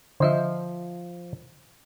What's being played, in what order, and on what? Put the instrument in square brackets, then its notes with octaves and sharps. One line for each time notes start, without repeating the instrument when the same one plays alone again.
[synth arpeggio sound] D3 D#5 E5 [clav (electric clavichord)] F3 C5